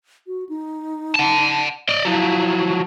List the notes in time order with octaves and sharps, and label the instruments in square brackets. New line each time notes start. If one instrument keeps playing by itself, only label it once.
[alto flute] F#4
D#4
[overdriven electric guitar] F#5 A5
D5 D#5
[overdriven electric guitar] F3 F#3 [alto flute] E4